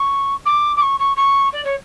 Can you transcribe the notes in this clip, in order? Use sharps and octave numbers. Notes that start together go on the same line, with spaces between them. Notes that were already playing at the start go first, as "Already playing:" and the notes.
Already playing: C#6
D6
D6
C#6
C#6
C#6
D5
C#5